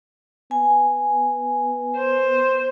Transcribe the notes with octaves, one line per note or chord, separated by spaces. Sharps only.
B3 G#5
C5